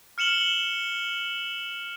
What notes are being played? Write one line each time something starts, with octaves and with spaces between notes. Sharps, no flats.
F6 C#7 E7 F#7 G7